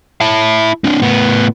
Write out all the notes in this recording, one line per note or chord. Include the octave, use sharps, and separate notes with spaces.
E4 A5
C4 D4
A2 B3